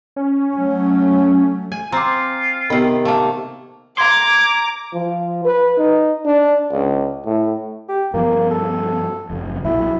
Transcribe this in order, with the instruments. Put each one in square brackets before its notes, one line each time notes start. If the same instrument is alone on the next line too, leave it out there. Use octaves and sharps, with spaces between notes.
[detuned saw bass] C#4
[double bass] F#3 A3
[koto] G#5
[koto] C4 [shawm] F4 [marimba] A#5 C6 D6
[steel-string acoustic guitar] C3 D#3 [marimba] B3
[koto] A3 A#3 [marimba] F5
[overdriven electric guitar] A#5 C6 [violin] D6 [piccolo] G#6
[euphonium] F3
B4
D#4
D4
C#2
A2
[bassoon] G4
[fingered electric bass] G2 F3 B3 [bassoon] A#3
[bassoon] A4
[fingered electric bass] F#1 F2
[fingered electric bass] B1 A#2 F#3 [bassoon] E4